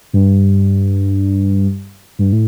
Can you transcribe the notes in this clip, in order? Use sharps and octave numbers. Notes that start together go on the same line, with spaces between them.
G2
G2
A2